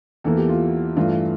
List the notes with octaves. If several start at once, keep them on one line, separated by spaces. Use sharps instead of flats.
E2 E3 A#3 A4
G4
F4
G2 E3 A3 F4